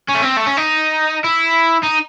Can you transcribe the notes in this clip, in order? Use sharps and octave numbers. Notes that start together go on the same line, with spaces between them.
C#4
A3
C4
A3
C#4
D#4
E4
D#4